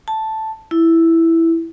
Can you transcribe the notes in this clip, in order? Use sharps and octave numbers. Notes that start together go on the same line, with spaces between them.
A5
E4